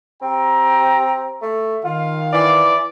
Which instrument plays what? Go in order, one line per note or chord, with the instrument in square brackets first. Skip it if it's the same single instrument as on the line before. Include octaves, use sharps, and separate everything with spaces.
[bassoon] C4 [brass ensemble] G4 G5 A#5
[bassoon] A3
[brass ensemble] D#3 F5 [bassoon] F4
[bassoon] E3 [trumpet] D5